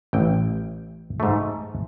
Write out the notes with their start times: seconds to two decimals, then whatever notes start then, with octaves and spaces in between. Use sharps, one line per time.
0.13 A1 G5
1.20 G#2 A3